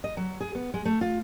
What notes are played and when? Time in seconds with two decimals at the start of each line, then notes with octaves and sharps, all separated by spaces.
0.04 D#5
0.17 F#3
0.41 G#4
0.55 B3
0.74 G#3
0.85 A3
1.01 F4